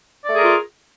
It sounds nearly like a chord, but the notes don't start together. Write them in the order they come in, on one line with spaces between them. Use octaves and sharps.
D5 A3 G#4 A#4 F4